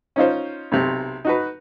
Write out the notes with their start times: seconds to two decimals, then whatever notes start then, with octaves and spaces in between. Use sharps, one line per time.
0.16 C#4 D#4 F4 C5
0.72 B1 C3
1.25 D#4 F#4 B4